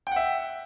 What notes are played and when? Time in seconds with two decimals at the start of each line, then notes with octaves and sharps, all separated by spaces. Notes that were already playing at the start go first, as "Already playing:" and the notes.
0.07 G5
0.12 F#5
0.16 E5